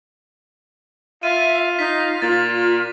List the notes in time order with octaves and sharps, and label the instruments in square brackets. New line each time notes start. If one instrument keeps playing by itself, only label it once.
[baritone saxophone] F4 [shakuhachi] E5 [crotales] D#7
[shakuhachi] D#4 [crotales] B6
[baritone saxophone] A#2 [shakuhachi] F4 [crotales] A6